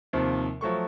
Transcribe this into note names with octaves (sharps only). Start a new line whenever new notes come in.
D#2 C3 F3
F3 F#3 A3 C#6